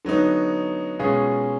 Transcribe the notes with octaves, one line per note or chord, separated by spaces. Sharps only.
D3 F#3 B3 D#4
B2 G#3 C#4 F4 G#4